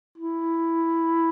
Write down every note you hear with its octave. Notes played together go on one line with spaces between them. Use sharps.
E4